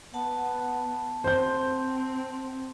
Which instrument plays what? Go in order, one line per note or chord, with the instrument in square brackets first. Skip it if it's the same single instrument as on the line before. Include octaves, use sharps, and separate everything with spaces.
[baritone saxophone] B3 [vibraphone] F#5 A5
[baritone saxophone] C4 [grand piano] C5 G6